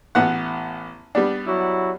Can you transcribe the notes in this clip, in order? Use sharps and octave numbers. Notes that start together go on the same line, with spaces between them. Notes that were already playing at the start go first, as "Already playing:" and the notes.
A1 B3 F#5
G3 B3 D4
F#3 E4 F#4